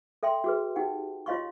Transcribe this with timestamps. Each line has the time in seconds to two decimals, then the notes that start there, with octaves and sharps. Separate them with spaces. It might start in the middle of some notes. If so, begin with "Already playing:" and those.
0.23 A4 E5 G5 C6
0.44 F#4 G#4 B4
0.76 D#4 G4 F#5 G5
1.26 F4 C#5 D#5 F5 C6 C#6